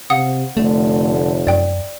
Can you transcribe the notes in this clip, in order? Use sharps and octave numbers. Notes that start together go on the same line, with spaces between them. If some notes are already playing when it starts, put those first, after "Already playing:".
C3 F5 F#5 D#6
F1 D3 A3
F#2 D5 G5